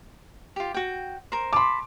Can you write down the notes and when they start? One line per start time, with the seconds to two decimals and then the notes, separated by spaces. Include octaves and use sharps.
0.56 F4 G4
0.74 F#4 G5
1.32 A#4 C5
1.53 A5 B5 C6 D6